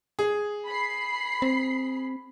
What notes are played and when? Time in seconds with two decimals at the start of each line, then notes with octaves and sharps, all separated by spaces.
0.19 G#4
0.67 B5 C7
1.42 C4